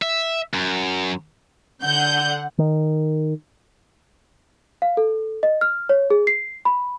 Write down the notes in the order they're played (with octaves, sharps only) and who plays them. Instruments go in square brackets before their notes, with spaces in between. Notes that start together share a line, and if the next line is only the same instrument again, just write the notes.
[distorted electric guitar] E5
F#2
[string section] D3 F#5 [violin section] G6
[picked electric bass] D#3
[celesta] F5
A4
D#5
F6
C#5
G#4
C7
B5